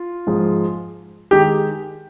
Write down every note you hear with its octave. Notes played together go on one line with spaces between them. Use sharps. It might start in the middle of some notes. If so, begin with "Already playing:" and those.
Already playing: F4
G#2 F3 G#3
D#3 G#3 G4